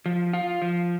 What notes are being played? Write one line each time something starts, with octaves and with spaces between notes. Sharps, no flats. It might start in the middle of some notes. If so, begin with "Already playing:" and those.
F3
F4
F3